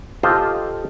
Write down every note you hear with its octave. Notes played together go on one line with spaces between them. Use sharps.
F4 G4 A4 C5 D#5 F5